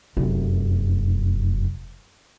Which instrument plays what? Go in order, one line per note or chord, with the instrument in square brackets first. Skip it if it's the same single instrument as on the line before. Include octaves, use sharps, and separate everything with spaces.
[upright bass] F1 F#2